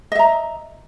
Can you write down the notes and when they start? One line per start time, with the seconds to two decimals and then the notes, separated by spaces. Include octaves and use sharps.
0.12 D#5
0.15 E5
0.19 A#5